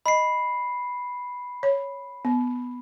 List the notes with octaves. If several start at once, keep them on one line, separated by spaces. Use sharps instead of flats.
D#5 B5 C7
C#5
B3